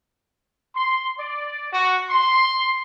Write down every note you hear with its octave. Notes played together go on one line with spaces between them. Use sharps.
C6
D5
F#4
C6